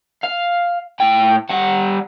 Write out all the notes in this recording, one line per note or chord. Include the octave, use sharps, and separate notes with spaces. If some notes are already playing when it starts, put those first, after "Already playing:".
F5
A2 G5
G3 F#5